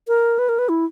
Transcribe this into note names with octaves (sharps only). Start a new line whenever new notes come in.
A#4
B4
A#4
B4
E4